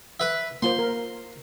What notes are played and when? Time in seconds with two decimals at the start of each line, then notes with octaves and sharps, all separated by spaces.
0.20 B4 E5
0.62 A#3 F4 C5 C6
0.79 A#4